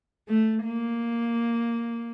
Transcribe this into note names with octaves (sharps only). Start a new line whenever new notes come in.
A3
A#3